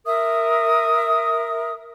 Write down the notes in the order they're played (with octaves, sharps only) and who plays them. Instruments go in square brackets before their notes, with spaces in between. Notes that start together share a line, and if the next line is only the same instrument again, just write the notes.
[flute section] A#4 E5 D#6